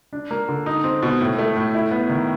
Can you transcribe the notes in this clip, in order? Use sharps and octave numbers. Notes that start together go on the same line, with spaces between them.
D4
A#3
D3
D#4
C4
B2
A2
A3
A2
E4
B3
D#3